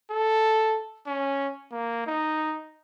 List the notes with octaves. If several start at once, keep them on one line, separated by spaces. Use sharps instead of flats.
A4
C#4
A#3
D#4